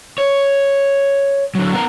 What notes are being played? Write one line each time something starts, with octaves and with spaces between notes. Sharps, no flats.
C#5
D3 F#3
B3 A#4